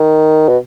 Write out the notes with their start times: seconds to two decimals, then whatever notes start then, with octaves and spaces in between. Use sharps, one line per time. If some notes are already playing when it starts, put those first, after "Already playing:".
Already playing: D#3
0.49 B2